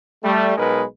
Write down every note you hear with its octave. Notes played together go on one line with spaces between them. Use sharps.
G3 A3
B1 B2 G#3 D#4 A#4 B4